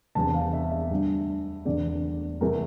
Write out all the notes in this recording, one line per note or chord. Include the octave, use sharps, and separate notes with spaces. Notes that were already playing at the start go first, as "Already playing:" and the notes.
E1 E2 C3 A5
F5
E5
E5
D2 D3 G3
E1 E2 D3 A3 D5
F1 E2 E3 A3 A#4